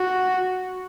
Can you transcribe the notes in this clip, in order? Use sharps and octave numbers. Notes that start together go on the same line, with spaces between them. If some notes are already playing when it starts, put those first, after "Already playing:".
Already playing: F#4